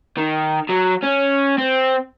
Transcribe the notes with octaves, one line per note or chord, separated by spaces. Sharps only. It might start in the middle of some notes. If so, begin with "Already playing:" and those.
D#3
F#3
C#4
C4